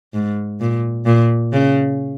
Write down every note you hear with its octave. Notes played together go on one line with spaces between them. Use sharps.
G#2
A#2
A#2
C#3